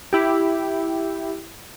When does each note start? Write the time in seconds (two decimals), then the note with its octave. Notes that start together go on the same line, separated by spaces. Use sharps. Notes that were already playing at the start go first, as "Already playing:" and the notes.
0.13 E4 G4